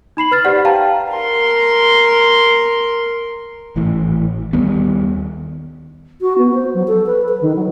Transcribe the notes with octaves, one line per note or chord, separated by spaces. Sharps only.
D#4 B5 C7 F#7
B4 F6 A6
G4 C5 D5 F#5
F5 G5 A5 A#5
A#4 C6
G#1 A2 E3
D#2 D#3 G3 B3
F#4
B3
C5
F#3
A4
B4
B4
D#3
F#3